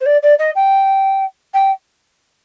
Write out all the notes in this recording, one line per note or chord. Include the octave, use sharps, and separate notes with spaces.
C5
D5
D5
D#5
G5
G5